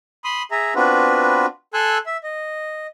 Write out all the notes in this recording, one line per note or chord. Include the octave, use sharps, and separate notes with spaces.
B5 C6 D#6
G#4 E5 A#5
B3 C4 D4 F4 F#4 B4
A4 G#5 C6 E6 F#6
E5
D#5